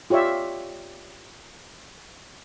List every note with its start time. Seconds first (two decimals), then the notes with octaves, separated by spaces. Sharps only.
0.10 F4 G4 C#5 D5 E5